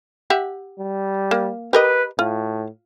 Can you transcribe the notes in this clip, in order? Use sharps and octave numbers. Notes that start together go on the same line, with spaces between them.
G4 E5 F#5
G3
A#3
G4 A#4 B4 D#5
A2 F4